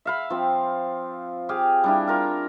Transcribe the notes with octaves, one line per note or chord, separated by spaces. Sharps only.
E5 F5 B5
F3 C4
G4 G#4 F5
G3 D4 E4
F4 A#4 F5